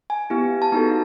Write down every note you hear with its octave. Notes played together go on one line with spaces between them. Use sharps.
G#5
B3 E4 G4
A5
B3 D#4 F#4 A4 A#5